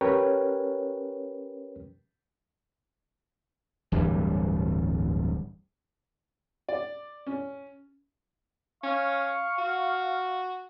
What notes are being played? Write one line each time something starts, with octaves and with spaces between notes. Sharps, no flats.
C#4 G4 A#4 B4 C#5 G5
D1 G2 E3 G3
D5
C#4
C#4 F5 C#6
F#4